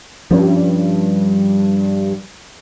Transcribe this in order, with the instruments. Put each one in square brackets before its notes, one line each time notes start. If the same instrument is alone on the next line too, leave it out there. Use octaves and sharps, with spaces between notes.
[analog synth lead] G2 [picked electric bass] F3 C#4